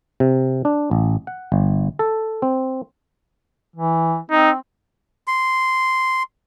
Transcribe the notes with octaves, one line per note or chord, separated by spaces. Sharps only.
C3
D4
A1
F#5
G1
A4
C4
E3
C4 D#4
C6